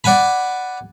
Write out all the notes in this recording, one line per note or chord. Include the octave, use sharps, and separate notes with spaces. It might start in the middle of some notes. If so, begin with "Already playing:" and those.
D5 F#5 G#5 B5